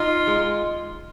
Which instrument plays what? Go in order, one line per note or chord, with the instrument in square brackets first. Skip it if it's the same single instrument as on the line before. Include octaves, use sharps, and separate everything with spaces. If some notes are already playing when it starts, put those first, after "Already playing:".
Already playing: [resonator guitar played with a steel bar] D#4 [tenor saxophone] F4
[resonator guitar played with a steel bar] G#3